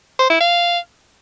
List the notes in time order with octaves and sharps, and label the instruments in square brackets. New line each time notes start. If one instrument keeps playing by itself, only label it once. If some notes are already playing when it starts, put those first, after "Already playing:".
[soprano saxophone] C5
E4
F5